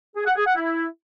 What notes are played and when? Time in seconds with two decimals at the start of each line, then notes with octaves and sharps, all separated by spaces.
0.17 G#4
0.26 F#5
0.36 G#4
0.46 F#5
0.56 E4